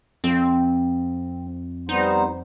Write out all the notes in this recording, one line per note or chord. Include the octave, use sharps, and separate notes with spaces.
F2 C4
G3 B3 D#4 C5